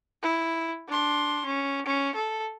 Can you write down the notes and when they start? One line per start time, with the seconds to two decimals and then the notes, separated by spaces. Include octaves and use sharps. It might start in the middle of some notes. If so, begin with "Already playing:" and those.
0.22 E4
0.88 D4 C6
1.46 C#4
1.86 C#4
2.15 A4